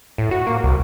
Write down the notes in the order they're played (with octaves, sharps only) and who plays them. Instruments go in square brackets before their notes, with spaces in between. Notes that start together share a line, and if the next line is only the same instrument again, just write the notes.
[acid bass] A2
F#4
A#3
C2